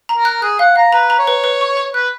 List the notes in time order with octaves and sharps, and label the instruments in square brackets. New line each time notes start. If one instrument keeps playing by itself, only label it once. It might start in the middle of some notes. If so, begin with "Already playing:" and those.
[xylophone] A#5
[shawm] A#4
[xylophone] F#6
[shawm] G#4 [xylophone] F#6
[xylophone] F5 [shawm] F#5
[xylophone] F5 [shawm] A#5
[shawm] B4 [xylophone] A#5
[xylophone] A#5
[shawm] C#5
[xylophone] B4
B4
C#6
C#6
[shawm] B4 [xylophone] F#6